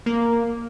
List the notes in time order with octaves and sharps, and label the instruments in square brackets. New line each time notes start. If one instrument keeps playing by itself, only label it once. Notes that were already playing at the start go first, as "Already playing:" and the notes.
[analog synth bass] A#3